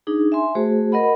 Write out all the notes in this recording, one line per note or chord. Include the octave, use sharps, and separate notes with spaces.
D4 D#4 G#4
E5 G#5 C6
A3 F#4 G#4 C5
A#4 D#5 F#5 B5